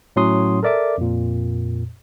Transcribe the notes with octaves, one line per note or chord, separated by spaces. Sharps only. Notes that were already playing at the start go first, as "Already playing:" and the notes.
A2 F#3 C#4 C6 D#6
A4 A#4 D5 E5 D6
F2 A#2